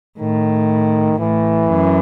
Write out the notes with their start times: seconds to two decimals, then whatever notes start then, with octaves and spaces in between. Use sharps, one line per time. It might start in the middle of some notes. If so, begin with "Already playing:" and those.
0.19 A2 D#3
1.19 A2 E3
1.70 F#2